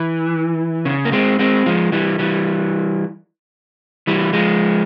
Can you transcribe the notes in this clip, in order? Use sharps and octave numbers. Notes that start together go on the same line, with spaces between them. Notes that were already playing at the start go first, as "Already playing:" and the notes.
Already playing: E3
C#3
A#3
G#3 C4
G#3 C4
F3 G#3
E3 G3
E3 G3
E3 G3
F3 G#3